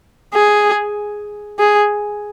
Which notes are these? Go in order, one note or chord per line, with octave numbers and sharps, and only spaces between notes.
G#4
G#4